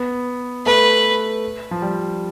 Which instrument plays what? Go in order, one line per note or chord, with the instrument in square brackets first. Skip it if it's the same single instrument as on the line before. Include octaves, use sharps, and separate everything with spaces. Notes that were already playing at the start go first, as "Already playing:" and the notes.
Already playing: [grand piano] B3
[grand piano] A3 [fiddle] B4
[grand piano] F3
G3